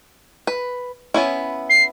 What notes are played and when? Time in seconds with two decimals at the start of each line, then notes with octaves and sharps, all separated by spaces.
0.47 B4
1.14 B3 C#4 E4
1.70 C7